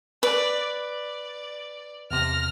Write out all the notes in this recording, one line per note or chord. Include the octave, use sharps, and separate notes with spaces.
B4 D5
D5
E2 C3 F6 A#6